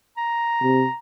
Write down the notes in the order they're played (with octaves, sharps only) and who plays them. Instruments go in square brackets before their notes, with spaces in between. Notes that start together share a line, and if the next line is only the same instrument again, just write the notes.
[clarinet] A#5
[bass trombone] C3